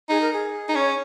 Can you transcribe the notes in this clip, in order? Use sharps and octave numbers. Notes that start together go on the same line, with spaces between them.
D#4 G#4
A#4
G#4
D#4
C#4 C#5